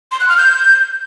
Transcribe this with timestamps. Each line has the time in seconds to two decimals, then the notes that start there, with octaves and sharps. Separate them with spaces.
0.12 C6
0.20 F#6
0.29 F6
0.37 G6